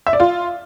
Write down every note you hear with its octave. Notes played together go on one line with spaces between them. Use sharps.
E5
D5
F4